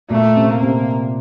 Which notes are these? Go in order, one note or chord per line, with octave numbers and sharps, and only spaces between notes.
A#2 A3 A#3
C3 C4
A#3
C3 C4